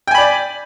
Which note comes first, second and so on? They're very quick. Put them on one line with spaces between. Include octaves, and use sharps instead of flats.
G5 G#5 B5 D5